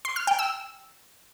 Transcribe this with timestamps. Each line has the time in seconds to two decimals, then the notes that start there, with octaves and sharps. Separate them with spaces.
0.05 C6
0.16 F6
0.27 G5
0.39 E6